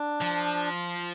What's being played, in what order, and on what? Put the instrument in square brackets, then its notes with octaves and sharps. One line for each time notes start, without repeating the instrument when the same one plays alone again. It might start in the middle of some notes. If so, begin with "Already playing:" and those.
Already playing: [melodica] D4
[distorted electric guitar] F3